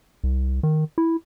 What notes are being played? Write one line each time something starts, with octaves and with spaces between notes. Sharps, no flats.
C2
D#3
E4